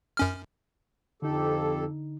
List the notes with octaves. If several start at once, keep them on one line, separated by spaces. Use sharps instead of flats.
F#2 C#4 F6
F2 D3 D#4 G4 A4